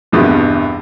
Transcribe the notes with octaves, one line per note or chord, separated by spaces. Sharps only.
G#1 E2 G2 B2